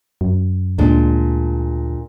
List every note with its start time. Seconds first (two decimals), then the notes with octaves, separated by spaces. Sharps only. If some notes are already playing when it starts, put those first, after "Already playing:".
0.21 F#2
0.78 D2 A#2 G#3 D4